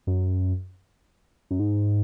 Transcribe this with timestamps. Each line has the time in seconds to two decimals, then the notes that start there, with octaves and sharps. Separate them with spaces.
0.07 F#2
1.51 F#2
1.60 G#2